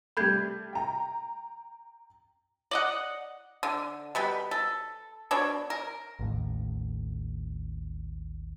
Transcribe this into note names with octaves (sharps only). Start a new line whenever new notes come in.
G3 A3 B5 G6 G#6
G5 A#5
D5 D#5 F#5
D3
B2 G3 B4
A4
B2 D4 C#5
A#4
A1 D#2 A2